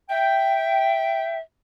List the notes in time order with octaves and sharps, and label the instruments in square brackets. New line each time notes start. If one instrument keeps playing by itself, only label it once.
[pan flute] E5 [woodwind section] G5